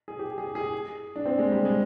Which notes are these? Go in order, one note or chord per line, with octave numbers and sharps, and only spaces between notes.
G#4
G4
G#4
G#4
D4
C4
G#3
G3
G#3